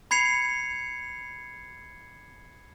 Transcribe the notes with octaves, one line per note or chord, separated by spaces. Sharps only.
B5 G#6 C7 C#7 F7